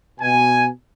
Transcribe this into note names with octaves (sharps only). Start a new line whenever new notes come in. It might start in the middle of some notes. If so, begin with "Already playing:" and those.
B2 G#5